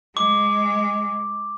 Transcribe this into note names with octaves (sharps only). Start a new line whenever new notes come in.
G#3 D6